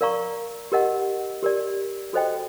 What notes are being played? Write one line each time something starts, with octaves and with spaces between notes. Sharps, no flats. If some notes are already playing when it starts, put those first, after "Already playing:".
A#4 D5 F5 A#5 C#6
G4 A#4 D#5 F#5
G4 A#4 D5
F#4 A4 C5 D#5 G5